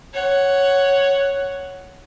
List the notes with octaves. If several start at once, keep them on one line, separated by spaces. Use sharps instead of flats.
C#5 F#5